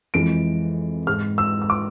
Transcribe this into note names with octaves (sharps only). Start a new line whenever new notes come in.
F2 E3 G#3 D7
G#2 G#3 F6
E6
E6
D6